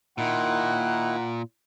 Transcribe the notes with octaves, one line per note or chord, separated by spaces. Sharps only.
A#2 D#3 D#4 E4 F#5